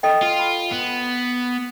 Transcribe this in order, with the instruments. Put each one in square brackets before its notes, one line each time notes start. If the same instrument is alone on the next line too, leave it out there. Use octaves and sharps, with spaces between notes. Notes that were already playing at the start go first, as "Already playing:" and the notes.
[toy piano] A4 D#5 G5
[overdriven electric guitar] F4
[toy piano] B5
[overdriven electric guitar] B3